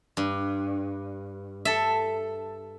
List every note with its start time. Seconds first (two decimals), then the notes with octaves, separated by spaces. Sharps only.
0.17 G2
1.65 A4 E5